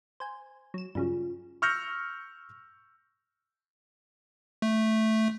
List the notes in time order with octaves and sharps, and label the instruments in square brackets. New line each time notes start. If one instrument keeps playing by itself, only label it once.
[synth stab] C5 G#5
F#3 E7
[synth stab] G2 C#3 F#3 [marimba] F4
[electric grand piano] C#6 E6 F6 G6 A#6 C#7
[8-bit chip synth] A3